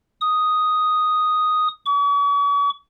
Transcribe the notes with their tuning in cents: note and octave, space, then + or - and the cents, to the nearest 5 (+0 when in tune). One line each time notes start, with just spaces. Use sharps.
D#6 +0
C#6 +45